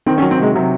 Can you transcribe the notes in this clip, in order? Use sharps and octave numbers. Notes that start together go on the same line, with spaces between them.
D#3 C4
C#4
F#3
C4
C3 G#3
C3 F#3